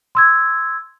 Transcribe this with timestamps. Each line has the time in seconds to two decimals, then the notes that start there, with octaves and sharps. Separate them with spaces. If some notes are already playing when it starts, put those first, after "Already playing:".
0.15 C6 E6 G#6